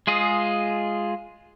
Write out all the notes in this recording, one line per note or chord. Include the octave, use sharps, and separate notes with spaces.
G#3 F4 G#4 D#5